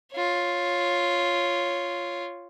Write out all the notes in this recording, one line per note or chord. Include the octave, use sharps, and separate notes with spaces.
F4 C#5